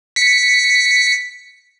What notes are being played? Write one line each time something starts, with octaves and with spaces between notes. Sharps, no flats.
B6 C#7